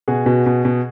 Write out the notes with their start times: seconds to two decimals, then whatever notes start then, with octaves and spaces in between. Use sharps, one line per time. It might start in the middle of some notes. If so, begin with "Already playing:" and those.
0.08 B2 F#4 G#4
0.26 B2
0.46 B2
0.65 B2